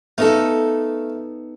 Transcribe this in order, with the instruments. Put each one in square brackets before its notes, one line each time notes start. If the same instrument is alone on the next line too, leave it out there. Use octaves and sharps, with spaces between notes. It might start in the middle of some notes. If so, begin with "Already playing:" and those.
[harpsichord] A3 F5 [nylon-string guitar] B3 D#4 A4